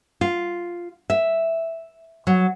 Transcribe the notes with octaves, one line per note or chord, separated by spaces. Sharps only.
F4
E5
F#3